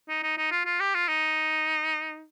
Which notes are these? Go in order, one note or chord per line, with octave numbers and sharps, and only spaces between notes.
D#4
D#4
D#4
F4
F4
G4
F4
D#4